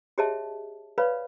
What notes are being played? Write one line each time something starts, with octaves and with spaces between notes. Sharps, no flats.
G4 G#4 C#5 D#5 E5 A5
B4 C#5 D5 F5 B5